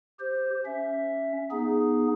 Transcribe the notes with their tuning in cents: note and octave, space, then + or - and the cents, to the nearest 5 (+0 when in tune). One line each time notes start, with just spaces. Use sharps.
G4 +5 C5 +0
C#4 +0 E5 +0
B3 -25 D#4 -5 G#4 +0